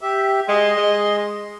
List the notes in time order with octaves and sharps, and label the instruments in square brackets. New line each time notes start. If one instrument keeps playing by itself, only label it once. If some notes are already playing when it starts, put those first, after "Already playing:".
[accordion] G4 E5
[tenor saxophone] G#3 [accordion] D#5 C6
[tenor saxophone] G#3